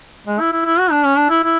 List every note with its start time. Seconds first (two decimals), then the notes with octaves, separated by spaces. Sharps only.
0.27 G#3
0.40 E4
0.53 E4
0.65 E4
0.79 F#4
0.91 D4
1.05 C#4
1.17 D4
1.30 E4
1.44 E4